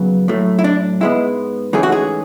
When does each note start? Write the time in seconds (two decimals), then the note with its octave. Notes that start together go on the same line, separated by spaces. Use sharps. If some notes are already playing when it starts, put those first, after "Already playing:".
Already playing: F#2 C#3 F#3 B3
0.28 A2 F#3 A3
0.59 E4
0.64 D4
1.01 G#2 G#3 B3 E4
1.73 G#2 E3 A3 C#4 G#4
1.83 F#4
1.92 G#4